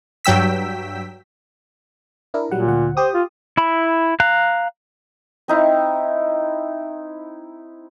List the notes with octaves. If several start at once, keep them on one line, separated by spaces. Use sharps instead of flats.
G2 F#3 G5 E6 B6
D4 E4 A#4
A#2 F#3 G3 F#5
D2 F#5
G4 C5 D#6
F4
E4 B5
F5 A#5 F#6
C4 D#4 E4